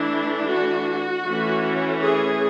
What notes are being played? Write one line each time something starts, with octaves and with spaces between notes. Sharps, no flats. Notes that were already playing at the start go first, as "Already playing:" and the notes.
Already playing: E3 A3 D4 E4
F#4
E3 A3 C#4
G#4